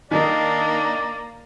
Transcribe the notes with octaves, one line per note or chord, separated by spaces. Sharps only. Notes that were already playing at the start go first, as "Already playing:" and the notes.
D#3 A#3 D4 D#4 D5